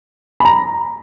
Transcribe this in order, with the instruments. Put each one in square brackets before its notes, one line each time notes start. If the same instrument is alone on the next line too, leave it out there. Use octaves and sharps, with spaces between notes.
[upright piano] B5
A#5